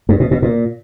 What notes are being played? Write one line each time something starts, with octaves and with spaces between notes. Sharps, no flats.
G2
B2
B2
A#2